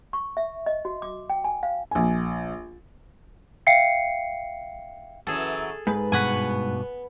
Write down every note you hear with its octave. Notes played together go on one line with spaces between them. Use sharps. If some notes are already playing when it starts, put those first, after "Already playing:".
C#6
E5
D#5
F#4
D6
G5
G#5
F5
A#1 G#5
E5 F5 G5 C7 C#7
F#2 E3 F#3 G#4 A4
G#2 B4
G2 B2 B3 F#4 B4 F#5 G#5